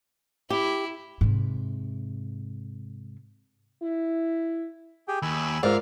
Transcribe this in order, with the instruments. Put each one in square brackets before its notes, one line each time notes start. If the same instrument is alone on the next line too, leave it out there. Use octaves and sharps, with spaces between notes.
[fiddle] E4 [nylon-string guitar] G4
[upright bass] G#2 C3
[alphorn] E4
[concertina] G4 G#4 G5
[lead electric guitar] D#2 [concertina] G#5 B5 E6
[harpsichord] G#2 [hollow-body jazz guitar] F4 A#4 D5 [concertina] E5 [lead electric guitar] F5